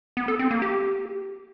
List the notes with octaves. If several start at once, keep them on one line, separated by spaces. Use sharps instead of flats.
B3
A4
C4
A#3
G4